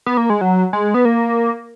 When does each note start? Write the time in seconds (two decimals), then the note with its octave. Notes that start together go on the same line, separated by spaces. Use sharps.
0.06 B3
0.17 A#3
0.30 G#3
0.41 F#3
0.73 G#3
0.94 B3
1.05 A#3